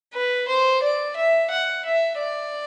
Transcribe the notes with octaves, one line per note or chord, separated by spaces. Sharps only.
B4
C5
D5
E5
F#5
E5
D5